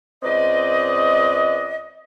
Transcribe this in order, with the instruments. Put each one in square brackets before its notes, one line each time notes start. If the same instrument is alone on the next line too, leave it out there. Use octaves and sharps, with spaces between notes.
[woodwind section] C#2 C4 B4 D5 D#5